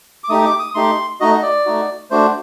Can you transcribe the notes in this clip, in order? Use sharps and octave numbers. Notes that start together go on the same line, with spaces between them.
D6
A3 D#4 G4 D#6
D6
D#6
A3 D#4 G4 C6
A3 D#4 F#4 D#5
D#5
D5
A3 D#4 F#4
A3 D4 F#4 C5